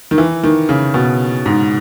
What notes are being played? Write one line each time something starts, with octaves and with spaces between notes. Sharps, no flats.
D#3
E3
D#3
C#3
B2
G#2